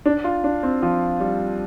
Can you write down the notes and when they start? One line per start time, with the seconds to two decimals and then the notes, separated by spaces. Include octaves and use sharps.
0.06 D4
0.24 F4
0.44 D4
0.63 C4
0.82 F3
1.20 G3